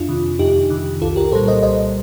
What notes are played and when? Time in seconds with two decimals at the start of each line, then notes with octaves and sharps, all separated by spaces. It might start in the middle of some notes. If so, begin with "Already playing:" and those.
Already playing: F2 D4 F4
0.09 C3 D#3
0.39 F2 D#4 G4
0.70 C3 D#3
1.01 C2 F4 A4
1.16 G4 A#4
1.32 A#2 G3 A4 C5
1.48 C5 D#5
1.63 C2 C5 D#5